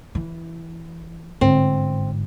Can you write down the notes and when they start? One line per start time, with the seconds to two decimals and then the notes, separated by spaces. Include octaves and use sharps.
0.15 E3
1.41 G1 G#2 C4